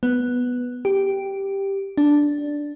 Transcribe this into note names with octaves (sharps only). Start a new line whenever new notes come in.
B3
G4
D4